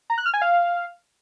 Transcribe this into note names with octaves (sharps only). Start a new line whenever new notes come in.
A#5
F#6
F6
G#5
F5